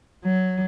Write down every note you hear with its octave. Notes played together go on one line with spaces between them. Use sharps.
F#3